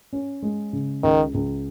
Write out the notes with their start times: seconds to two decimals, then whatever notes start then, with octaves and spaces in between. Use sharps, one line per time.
0.13 C#4
0.43 G#3
0.73 C#3
1.03 C#2 D#3
1.34 C#2